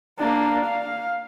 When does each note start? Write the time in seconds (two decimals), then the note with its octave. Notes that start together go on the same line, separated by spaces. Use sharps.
0.18 A#3 D4
0.64 F5